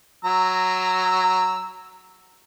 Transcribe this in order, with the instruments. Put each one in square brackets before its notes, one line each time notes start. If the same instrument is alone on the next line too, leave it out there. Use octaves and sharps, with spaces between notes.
[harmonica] F#3 A#5 E6